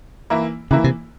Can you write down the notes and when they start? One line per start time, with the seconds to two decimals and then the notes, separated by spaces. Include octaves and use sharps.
0.30 E3 A#3 E4
0.71 C#3 E3 A#3 E4
0.84 C3